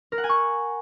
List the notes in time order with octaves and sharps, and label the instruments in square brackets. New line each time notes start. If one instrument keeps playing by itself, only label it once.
[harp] A#4
F#5
G#5
C#6